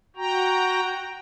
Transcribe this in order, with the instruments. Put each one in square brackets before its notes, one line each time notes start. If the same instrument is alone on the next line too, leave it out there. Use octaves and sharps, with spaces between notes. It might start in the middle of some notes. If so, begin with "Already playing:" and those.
[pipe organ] F#4 G5 A#5